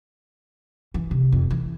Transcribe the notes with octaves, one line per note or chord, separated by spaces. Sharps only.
E3
C3
F2
E3